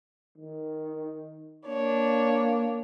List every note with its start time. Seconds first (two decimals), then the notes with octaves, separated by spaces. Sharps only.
0.38 D#3
1.67 A#3 D4 C#5